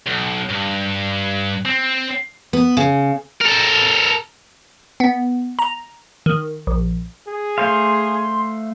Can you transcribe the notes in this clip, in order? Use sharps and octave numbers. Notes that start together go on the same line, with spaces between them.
B1
G2
C4
B3
C#3
A4 A#4
B3
A#5
D#3
A#1
G#4
A3 C5 F5 C6